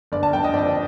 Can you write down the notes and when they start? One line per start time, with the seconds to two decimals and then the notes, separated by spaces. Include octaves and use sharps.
0.12 G1 D5
0.23 A5
0.33 G1 G5
0.44 D#5
0.54 F2 D5